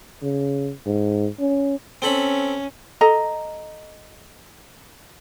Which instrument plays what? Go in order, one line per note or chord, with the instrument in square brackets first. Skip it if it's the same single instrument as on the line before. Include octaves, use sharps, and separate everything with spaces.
[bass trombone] C#3
G#2
C#4
[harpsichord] C4 A4 B5 [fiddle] C#4
[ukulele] A4 D#5 A#5